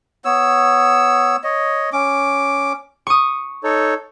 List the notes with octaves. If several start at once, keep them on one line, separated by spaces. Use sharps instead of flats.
B3 C#5 E6
C#5 D#5
C#4 D6
C#6 D#6
D#4 A4 C#5